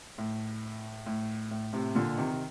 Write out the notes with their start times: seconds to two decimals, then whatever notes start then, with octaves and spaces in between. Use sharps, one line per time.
0.18 A2
1.06 A2
1.51 A2
1.73 A2 C3
1.95 A#2 D3
2.17 C3 D#3
2.31 C3